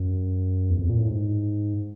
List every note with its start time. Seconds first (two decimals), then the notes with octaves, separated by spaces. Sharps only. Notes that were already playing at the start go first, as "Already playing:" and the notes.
Already playing: F#2
0.70 E2
0.79 F2
0.90 A#2
0.98 A2
1.09 G#2